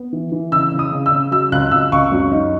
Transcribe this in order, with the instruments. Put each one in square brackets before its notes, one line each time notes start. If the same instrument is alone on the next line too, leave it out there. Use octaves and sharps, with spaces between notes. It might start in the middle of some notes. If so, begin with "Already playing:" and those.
Already playing: [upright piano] B3
E3
E3
C#3 E6
C#3
D#6
C#3
E6
C#3
F#3 E6
C#2 F#6
C#2 E6
C#2 C#6
F#2
D#4